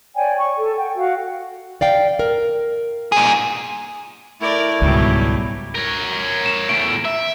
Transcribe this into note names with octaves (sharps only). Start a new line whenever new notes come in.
C#5 D5 G5 G#5
C#6
A4
F#5 G5
F#4 F5
D5 F5 G5
A#4
A#2 G#4
A3 E4 A#4 D5
C#2 G#2 B2 F#3 G3
A#4 C#5
E7
E2 A3 D7
E5